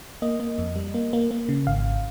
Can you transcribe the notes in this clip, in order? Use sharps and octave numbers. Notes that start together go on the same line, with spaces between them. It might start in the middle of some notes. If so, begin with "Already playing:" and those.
A#3 D#5
A#3
F2
G3
A#3
A#3
A#3
C#3
G#1 F5